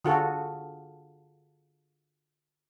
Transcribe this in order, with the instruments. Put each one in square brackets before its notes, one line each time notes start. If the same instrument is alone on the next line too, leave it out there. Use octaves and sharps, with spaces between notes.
[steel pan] D3 F4 F#4 G#4 A4